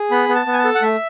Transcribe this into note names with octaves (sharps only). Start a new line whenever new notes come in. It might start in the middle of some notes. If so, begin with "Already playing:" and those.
Already playing: G#4
B3 B5
B3
A5
B3
G#5
A5
A4
F#5
A3 E5